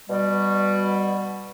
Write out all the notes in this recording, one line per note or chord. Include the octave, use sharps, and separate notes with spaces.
B2 G3